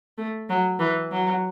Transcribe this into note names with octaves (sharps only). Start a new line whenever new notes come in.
A3
F#3
E3
F#3